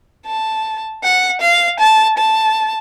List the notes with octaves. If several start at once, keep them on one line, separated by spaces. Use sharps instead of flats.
A5
F#5
F5
A5
A5